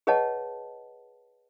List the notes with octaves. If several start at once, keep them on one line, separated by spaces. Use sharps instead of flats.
G#4 B4 C#5 D#5 F#5 A5